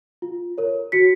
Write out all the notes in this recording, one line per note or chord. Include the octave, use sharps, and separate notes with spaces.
F4
A#4 C#5
F#4 B6 C#7